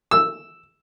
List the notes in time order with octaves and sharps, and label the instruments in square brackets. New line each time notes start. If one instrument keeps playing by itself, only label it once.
[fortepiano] E6